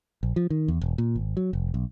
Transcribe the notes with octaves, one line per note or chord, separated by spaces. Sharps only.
A#1
F3
D#3
E2
E1
A#2
G#1
F#3
F1
B1